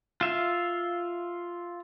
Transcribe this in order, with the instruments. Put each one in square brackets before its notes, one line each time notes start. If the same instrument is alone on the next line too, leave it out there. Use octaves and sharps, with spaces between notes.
[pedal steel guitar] F4 E5 F5